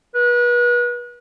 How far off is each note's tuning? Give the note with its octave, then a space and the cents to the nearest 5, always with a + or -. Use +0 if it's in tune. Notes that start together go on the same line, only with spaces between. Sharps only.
B4 -35